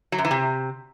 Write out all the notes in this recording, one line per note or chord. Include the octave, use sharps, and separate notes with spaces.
F#3
F#2
E3
C3